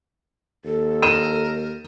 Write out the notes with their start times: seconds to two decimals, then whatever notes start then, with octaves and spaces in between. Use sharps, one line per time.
0.65 D#2 A4
1.02 A#4 D#7 E7